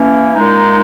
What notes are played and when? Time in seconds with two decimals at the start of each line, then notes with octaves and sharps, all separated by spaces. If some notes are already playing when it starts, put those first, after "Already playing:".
Already playing: E3 A#3 C#4
0.35 A#2 G#3 D#4